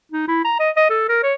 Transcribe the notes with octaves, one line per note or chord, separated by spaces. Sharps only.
D#4
E4
A#5
D#5
D#5
A4
A#4
C#5